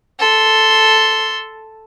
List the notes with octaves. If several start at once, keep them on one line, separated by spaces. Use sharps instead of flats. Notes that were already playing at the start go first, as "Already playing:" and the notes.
A4 C6